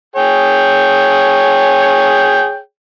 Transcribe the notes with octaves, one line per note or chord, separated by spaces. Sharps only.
G#4 C#5 G5